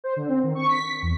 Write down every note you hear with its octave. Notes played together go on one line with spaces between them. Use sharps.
C5
D3
C4
D#3
C#6
B6
E2